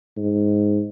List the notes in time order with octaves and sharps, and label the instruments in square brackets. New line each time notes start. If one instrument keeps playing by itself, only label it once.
[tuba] G#2